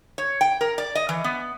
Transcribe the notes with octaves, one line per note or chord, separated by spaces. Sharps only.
C#5
G5
A#4
D5
D#5
E3
B3